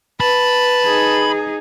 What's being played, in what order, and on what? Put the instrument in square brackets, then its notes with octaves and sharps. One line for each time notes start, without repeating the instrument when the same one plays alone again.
[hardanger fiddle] B4 A5 [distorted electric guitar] B5
[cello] D#4 G#4